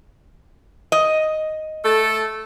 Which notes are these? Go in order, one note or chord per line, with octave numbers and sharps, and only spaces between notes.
D#5
A3 A4